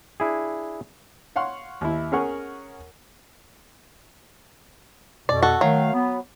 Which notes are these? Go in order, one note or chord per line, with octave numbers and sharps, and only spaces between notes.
D4 E4 G#4
C#5 F5 F#5 C6 C#6
D#2 E4
C#4 G#4 A#4 C#5 F#5 C#6
F2 B2 D5
F#4 A4
D#3 F#3 A3 F5
B3